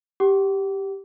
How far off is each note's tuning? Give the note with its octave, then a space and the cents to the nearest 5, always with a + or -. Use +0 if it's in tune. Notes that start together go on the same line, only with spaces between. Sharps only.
G4 +0 F#5 +45 D6 -30